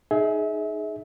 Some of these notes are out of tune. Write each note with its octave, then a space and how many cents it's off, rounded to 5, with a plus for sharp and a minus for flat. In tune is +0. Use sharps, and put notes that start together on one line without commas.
D#4 -5 G#4 +20 E5 -30